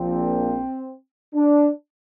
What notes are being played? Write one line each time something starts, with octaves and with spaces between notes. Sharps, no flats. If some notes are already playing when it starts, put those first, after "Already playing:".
Already playing: A#1 A#2 F3 C4
D4